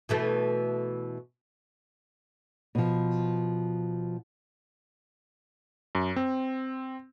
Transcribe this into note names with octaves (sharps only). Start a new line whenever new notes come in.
B2 E3 A3
B2 F3
F#2
C4